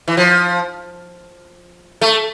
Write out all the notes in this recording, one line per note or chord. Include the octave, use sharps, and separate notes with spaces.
E3
F3
A3